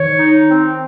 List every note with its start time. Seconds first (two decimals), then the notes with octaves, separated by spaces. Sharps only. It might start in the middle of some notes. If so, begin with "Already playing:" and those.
Already playing: D#3 C#5
0.19 D#4
0.49 C4